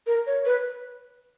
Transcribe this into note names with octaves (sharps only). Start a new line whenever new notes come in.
A#4
C#5
B4